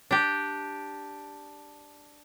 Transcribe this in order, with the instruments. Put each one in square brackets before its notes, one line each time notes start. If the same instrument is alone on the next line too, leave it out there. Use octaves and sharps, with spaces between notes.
[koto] D4 G4